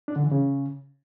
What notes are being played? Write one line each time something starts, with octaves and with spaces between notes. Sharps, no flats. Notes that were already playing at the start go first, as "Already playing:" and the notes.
D4
D3
E3
C#3